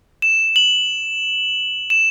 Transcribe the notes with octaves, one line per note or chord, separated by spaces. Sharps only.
E7
F#7
E7